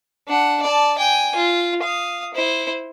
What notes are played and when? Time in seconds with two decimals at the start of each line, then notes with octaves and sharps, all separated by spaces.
0.28 D4 F#5
0.63 D5 A5
0.98 G5 G#5
1.36 F4
1.82 F5 D#6
2.34 E4 C5